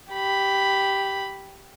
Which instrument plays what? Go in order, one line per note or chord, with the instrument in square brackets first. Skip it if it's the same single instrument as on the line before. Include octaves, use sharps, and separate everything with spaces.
[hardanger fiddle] G4 B5